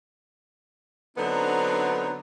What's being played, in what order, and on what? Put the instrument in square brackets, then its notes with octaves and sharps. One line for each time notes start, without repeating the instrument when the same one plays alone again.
[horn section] D3 F#3 B3 C4 D4 D#4